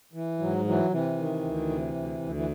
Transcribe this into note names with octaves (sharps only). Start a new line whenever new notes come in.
E3
G#2 F#3
E3 F#3
C3 E3
D#3
D2
C3
D2
D2
E3